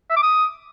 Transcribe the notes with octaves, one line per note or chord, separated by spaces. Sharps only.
E5
D6
D#6